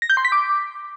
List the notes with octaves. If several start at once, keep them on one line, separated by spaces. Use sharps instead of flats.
A#6
G6
C6
B6
D6